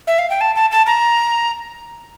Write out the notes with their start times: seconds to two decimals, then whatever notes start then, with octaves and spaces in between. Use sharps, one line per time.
0.07 E5
0.19 F5
0.30 G5
0.41 A5
0.55 A5
0.72 A5
0.87 A#5